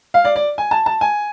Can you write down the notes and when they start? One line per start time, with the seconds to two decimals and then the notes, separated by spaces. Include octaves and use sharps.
0.14 F5
0.25 D5
0.36 D5
0.58 G#5
0.71 A5
0.86 A5
1.01 G#5